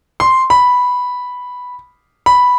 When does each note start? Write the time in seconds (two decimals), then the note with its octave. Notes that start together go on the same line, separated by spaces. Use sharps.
0.20 C6
0.50 B5
2.26 B5